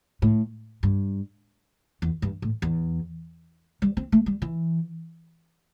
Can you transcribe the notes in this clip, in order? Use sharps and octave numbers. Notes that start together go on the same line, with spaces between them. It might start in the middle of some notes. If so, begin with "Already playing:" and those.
A2
G2
E2
G2
A2
E2
G3
C4
A3
G3
E3